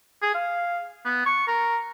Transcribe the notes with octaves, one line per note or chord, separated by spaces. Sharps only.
G#4
F5
B3
C#6
A#4